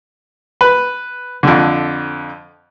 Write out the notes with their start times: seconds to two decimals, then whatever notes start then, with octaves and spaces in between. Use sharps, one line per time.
0.61 B4
1.43 F2 D3